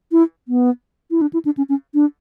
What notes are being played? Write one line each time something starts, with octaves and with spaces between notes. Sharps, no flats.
E4
B3
E4
D4
E4
D4
C#4
C#4
D4